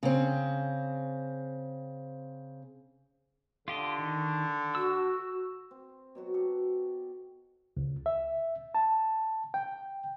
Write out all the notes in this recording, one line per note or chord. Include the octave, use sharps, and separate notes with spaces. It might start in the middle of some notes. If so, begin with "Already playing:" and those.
C#3 C4
D3 F4 G4 D#5
D#3
F#4 E6
C4
B2 F#3 F#4
G4 A4
C#2
E5
A5
G5